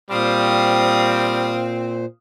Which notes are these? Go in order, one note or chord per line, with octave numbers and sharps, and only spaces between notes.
A#2 G3 C4 C5 F5 D#6